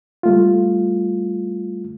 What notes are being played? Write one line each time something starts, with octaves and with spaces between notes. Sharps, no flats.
G3 A3 F4